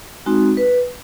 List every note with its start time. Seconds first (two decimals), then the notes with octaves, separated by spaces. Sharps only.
0.26 G#3 C4 D#4 F#4
0.57 B4